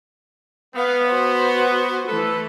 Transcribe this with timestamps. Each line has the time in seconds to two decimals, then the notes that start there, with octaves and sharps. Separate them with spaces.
0.76 B3 F5
1.07 F#4 C5
2.08 E3 A3 A4 B4